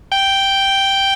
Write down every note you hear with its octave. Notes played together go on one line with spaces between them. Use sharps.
G5